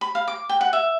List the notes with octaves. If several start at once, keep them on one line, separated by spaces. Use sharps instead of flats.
B5
F5
D6
G5
F#5
E5